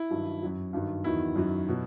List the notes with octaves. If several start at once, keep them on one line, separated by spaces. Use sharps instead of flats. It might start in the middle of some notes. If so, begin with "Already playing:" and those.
Already playing: E4
G2 D#3 F#3
F#2 F#3
G2 D#3 F#3
E2 D#3 F#3 E4
F#2 D#3 F#3
B2 F#3